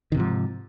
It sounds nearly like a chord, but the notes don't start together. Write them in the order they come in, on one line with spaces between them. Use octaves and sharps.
D#3 C3 G#2 F3